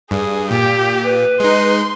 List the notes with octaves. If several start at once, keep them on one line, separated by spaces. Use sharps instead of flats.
G2 G#4
A#2 G4
B4
G#3 D#4 C6